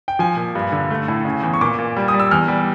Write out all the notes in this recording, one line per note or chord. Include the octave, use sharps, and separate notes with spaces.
G5
F3 G#5
A#2
G2
D3
A3
A2
C#3
E2
C#6
A#2 D6
A#2
G3
D#6
G3
E6
E2 F6
G3